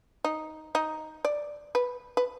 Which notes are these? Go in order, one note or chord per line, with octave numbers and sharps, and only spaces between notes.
D#4
D#4
D5
B4
B4